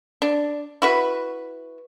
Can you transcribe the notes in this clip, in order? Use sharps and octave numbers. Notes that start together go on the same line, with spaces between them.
D4
E4 F#4 B4